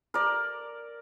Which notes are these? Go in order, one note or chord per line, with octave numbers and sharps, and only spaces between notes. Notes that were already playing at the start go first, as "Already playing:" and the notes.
A#4 D5